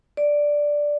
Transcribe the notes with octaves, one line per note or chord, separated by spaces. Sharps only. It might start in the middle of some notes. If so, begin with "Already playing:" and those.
D5